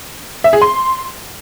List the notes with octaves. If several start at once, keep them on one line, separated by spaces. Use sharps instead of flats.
E5
G#4
C6